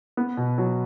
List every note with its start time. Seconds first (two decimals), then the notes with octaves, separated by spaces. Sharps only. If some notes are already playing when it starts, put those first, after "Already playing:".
0.17 B3
0.37 B2
0.58 F#3